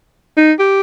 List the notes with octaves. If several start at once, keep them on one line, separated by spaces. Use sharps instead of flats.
D#4
G4